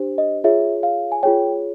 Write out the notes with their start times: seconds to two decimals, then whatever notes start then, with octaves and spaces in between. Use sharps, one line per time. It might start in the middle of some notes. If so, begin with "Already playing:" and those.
Already playing: D4 G4 C5
0.18 D#5
0.44 F4 G#4 C#5 E5
0.83 F5
1.12 G#5
1.23 F4 G#4 C#5 G5